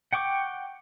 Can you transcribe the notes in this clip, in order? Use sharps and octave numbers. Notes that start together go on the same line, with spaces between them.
F#5 G5 C#6 D6